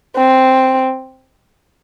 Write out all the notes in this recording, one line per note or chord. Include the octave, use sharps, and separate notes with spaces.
C4